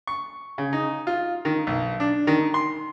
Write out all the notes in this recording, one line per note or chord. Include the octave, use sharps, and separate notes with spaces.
C#6
C#3
D#4
F4
D#3
B1
D4
D#3
C6